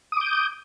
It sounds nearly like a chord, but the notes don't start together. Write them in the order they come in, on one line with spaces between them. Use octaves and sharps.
D#6 D6 G6